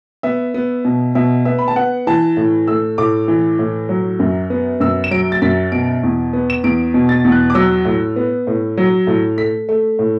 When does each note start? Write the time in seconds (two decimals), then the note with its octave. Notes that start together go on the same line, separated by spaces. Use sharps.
0.23 B3 E5
0.54 B3
0.85 B2
1.15 B2 E5
1.45 B3 E5
1.59 B5
1.68 A5
1.76 B3 F#5
2.07 E3 A5
2.37 A2
2.68 A3 E6
2.98 A2 D6
3.28 E3
3.59 A2
3.89 F#3
4.20 F#2
4.50 B3
4.80 F#2 E6
5.04 E7
5.11 F#3 D7
5.32 A6
5.42 F#2 B6
5.72 B2 D7
6.03 E2
6.33 B3
6.50 E7
6.64 E2 D7
6.94 B2
7.09 A6
7.24 E2
7.32 F#6
7.50 D6
7.55 F#3 E6
7.85 A2
8.16 B3
8.47 A2
8.77 F#3
9.07 A2
9.38 A3 B6
9.69 A3
9.99 A2